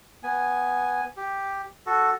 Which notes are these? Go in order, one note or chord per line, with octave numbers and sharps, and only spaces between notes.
B3 G#5
G4
F#4 A4